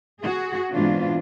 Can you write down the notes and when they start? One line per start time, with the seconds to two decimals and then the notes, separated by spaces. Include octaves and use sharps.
0.21 F#4 G#4
0.73 G#2 B2 E3 C4 D4 F4